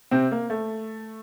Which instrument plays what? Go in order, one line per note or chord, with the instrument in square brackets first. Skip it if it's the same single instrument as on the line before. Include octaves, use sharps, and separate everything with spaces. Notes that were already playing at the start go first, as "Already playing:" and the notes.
[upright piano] C3 C4
A#3
A3